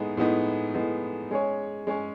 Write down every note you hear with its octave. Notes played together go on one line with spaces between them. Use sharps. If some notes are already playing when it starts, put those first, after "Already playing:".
Already playing: A2 G#3 B3 D#4
A2 G#3 B3 D#4
A2 G#3 B3 D#4
G#3 C#4 G#4 C#5
G#3 C#4 G#4 C#5